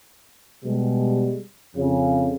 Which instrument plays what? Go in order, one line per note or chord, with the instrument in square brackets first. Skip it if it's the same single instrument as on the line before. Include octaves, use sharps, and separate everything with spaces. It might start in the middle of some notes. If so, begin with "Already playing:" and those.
[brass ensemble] B2 G3 G#3
F2 C#3